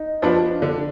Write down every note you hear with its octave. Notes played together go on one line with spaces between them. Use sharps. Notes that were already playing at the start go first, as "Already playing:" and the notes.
Already playing: D#4
F3 B3 D4 F4
D3 D4